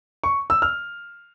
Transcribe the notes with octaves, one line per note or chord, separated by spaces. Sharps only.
C#6
E6
F6